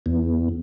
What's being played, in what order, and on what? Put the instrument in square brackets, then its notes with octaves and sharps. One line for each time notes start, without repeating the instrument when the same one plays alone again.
[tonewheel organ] E2